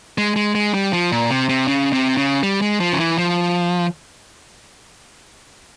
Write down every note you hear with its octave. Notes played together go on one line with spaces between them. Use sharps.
G#3
G#3
G#3
G3
F3
A#2
C3
C3
C#3
C3
C#3
G3
G#3
F3
C#3
E3
F3